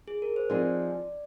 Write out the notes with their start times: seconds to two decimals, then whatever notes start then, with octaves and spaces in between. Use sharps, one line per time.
0.08 G#4
0.22 A#4
0.36 C5
0.50 F3 C4 D#4 G#4 D5